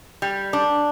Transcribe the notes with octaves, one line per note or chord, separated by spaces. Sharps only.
G3
D4